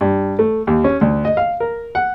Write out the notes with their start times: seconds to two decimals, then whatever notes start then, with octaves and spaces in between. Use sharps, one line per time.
0.01 G2
0.39 A3
0.67 D#2
0.84 C#4
1.01 D2
1.25 D#5
1.37 F5
1.60 A#4
1.95 F#5